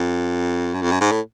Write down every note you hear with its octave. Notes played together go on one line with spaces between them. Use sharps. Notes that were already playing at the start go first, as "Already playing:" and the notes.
Already playing: F2
F#2
F2
F#2
G#2
A2